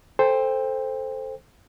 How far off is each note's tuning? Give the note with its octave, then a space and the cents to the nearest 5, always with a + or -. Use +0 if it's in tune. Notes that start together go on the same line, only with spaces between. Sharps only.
A4 +0 C5 +0 G5 +30